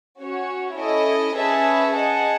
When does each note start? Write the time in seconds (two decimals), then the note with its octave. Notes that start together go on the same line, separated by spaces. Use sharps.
0.20 C#4 F#4 C#5
0.77 C#4 E4 A4 D#5
1.35 C#4 G#4 B4 E5 A5
1.93 G#4 D#5 F#5 A5